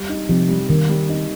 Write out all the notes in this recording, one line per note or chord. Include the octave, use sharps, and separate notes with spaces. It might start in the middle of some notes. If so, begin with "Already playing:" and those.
Already playing: G3
D#4
C3 F3
G3
D#3 A#3
G3
D#4